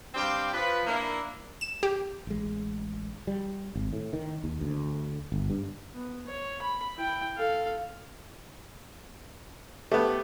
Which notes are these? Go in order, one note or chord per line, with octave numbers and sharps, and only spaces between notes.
G2 C4 G4 D5 F5 G5
F3 B4
A#3 D4 E4
E7
G4
A1 G#3
G3
G#1
A2
D#3
D#2
D2
G1
G2
B3
C#5
B5
E4 G5
A4 F5
A3 B3 G4